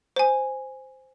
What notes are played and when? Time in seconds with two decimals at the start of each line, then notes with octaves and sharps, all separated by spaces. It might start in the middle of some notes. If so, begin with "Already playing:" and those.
0.16 C5 G#5